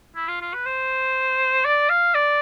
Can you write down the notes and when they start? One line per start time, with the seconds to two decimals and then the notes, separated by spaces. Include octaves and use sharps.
0.16 E4
0.28 F4
0.42 F4
0.54 B4
0.66 C5
1.65 D5
1.89 F5
2.14 D5